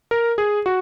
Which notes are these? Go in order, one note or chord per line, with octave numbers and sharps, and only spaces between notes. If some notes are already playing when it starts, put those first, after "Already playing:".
A#4
G#4
F#4